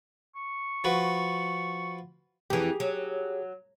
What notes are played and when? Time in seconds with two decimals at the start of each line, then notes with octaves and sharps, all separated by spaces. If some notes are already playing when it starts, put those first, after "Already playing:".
0.35 C#6
0.84 F3 F#4 B4
2.50 F2 E3 G4 G#4
2.80 F#3